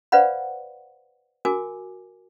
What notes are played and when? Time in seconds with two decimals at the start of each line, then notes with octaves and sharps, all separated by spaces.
0.12 B4 C5 D5 F5 F#5 B5
1.45 F#4 A#4 G#5 D6